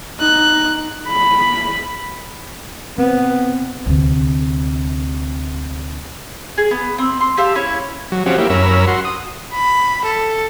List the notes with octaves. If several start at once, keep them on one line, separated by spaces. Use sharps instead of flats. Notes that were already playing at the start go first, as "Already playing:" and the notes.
D#4 F#6
B5
B3 C4
D2 C3
G#4
B3
C4
C6
G4 E5 F5 A5
C#4 E4 C#5
F#3
F3 C4 C#4 F#4 G4
A#3 E4 G4
F#2 C#4 A#4 B5 E6
F#4 C6
D#6
B5
A4